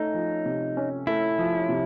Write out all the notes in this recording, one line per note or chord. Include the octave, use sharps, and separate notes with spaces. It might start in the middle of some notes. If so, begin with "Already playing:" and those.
Already playing: A3 C#4 D#4
F3
C3
C#4
A3 E4
F3
C3